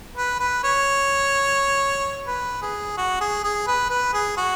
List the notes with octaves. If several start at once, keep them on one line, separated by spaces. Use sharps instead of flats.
B4
B4
C#5
B4
G#4
F#4
G#4
G#4
B4
B4
G#4
F#4